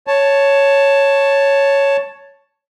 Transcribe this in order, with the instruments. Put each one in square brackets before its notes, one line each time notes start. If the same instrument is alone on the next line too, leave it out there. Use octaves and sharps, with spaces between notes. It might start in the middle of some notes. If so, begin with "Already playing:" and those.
[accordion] C#5 A5